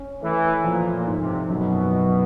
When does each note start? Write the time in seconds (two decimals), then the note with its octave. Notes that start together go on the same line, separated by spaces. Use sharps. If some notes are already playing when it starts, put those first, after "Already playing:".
Already playing: C#4
0.22 E3 A3
0.64 A#2 F3
0.93 A#2
1.07 G#2
1.20 C3
1.49 F#2 B2
1.91 F#3